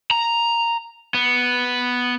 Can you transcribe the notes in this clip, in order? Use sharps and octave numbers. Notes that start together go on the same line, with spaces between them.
A#5
B3